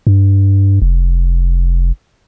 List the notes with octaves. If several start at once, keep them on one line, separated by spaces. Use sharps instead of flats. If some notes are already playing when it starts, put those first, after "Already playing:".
G2
F1